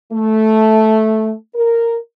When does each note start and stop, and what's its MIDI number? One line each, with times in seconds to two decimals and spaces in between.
0.12 1.33 57
1.55 1.96 70